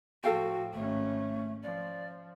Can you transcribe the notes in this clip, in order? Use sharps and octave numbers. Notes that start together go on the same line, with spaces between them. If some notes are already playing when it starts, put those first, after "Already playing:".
A2 F3 F#4 A4 F5 G5
G#1 A3 C#4
F3 D5